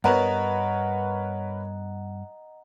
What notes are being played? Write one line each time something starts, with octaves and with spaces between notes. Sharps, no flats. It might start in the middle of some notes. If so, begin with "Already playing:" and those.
G2 B3 A#4 B4 C#5 D#5 F#5 A#5